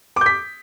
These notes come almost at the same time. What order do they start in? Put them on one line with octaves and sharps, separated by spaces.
D6 G6 B6